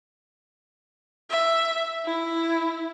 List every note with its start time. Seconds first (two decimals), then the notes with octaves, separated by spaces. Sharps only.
1.30 E5
2.06 E4